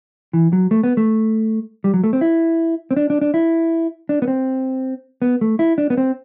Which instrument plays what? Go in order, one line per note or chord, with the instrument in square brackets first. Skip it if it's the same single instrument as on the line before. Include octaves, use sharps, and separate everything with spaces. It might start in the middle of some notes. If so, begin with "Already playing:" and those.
[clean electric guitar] E3
F#3
A3
B3
A3
G3
F#3
A3
C4
E4
C4
D4
D4
D4
E4
D4
B3
C4
B3
A3
E4
D4
B3
C4